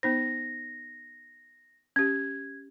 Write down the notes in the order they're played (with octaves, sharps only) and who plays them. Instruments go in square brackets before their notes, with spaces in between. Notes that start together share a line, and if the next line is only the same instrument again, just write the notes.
[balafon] B3 D#4 C5 [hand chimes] A#6
[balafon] C#4 G4 [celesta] G#6